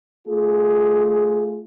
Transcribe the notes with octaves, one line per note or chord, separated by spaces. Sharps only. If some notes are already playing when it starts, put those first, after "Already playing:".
A3 F4 G#4